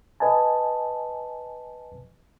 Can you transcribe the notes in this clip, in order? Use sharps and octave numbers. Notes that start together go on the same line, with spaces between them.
B4 D#5 G#5 A5